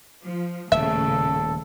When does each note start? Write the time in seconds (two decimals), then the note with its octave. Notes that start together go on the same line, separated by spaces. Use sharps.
0.22 F3
0.72 D#1 A2 C#3 A4 E5